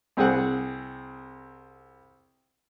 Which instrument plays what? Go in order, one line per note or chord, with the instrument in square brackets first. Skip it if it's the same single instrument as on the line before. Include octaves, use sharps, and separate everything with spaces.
[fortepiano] C2 C4 G#4 F#5